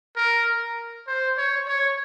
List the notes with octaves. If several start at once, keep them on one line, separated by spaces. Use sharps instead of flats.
A#4
C5
C#5
C#5